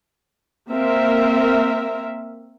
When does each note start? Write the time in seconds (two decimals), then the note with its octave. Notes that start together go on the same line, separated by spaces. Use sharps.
0.72 A#3 C4 A#4 E5